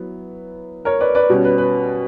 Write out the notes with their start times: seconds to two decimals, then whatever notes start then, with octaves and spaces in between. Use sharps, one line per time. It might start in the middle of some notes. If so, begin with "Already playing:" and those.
Already playing: F#3 B3 E4
0.85 A#4 C#5
1.00 B4 D5
1.15 B4 D5
1.30 B2 G3 C#4
1.45 B4
1.58 B4